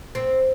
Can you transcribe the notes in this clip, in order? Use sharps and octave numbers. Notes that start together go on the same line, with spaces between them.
C4